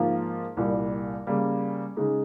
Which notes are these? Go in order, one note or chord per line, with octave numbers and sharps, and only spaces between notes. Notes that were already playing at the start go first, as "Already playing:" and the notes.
Already playing: G#2 F3 A#3 F4 A#4
C2 A#2 G3
C#3 G3 A#3
C#3 G#3 D#4